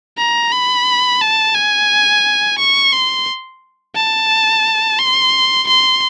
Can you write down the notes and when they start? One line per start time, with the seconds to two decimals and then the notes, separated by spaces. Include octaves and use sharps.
0.18 A#5
0.52 B5
1.21 A5
1.55 G#5
2.59 C#6
2.93 C6
3.95 A5
4.99 C6
5.68 C6